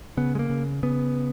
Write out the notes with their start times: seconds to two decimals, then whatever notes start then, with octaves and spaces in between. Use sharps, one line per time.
0.17 C#3 B3
0.35 G#3
0.39 A#3
0.50 C#3
0.83 C#3 B3